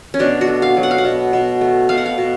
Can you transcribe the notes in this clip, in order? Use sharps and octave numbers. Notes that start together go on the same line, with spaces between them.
C#4
B2 D4
F#4
A3
F5
F#3
F#5
F5
F#5
B2
B2
A3
B2 F5
F#5
F5
B2